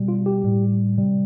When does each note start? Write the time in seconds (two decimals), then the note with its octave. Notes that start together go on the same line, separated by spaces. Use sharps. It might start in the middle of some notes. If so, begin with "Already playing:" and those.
Already playing: B2 G3
0.08 F4
0.26 G4
0.44 A2 G3
0.98 C3 G3